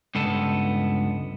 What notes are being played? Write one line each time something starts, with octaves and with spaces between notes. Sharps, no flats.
C#2 G2 B3 A4